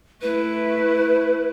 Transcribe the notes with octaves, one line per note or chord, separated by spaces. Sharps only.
A3 E4 B4